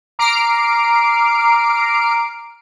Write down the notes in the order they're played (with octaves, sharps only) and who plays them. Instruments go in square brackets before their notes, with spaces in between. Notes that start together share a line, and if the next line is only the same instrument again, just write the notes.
[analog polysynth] A#5 D6 F6 C7 D7